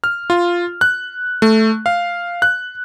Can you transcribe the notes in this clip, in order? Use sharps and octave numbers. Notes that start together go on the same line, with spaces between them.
F6
F4
F#6
A3
F5
F#6